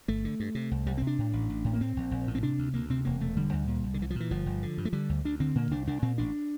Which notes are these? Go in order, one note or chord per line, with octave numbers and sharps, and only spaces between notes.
G1 A3
D3
G2
C3
C2
C2 G3
C4
C3
D4
A2
A1
A1
A2
A#3
A2 C4
A#1
A#1
A2
C4
C3 D4
D2
D2 A#3
C3 C4
E1 A#3
E1 A3
D3 G3
D2
A#2
C2
D3
C2 E3
F3
A#2 E3
G1 F3
G1
D3
G2
A3
D3 G3
D2
D2 D4
D3 C4
A#2 A#3
C2 D4
C2 D4
A#2 C4
A1 D4